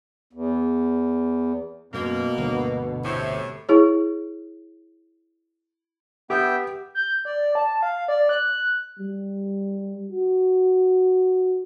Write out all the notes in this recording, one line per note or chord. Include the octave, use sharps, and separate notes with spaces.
E2
F#2 B2 A#3
G1 D2
A2 C3
E4 G#4 C#5
B3 G4 E5 G5
G6
D5
A5
F5
D5
F#6
G3
F#4